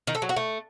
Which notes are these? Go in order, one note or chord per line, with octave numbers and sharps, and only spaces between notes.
D#3
A4
F#3
F#4
A3